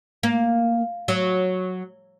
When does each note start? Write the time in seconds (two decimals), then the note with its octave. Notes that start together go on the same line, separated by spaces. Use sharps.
0.23 A#3
1.08 F#3